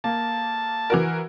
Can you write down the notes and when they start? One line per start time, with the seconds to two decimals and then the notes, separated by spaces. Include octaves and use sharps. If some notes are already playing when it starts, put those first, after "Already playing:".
0.04 A#3 A5
0.90 E3 F#4 A#4